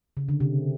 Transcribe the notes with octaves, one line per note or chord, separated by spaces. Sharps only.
C#3
D3
C3